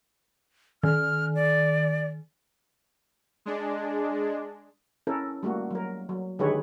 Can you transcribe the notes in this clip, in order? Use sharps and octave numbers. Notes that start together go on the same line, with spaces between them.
D#3 F6
D5
G#3 D4
C#4 E4 A4 A#4
G3 A3 A#3 F#4
F#3 A#4
F#3
D3 D#3 G#3 G4 B4 C#5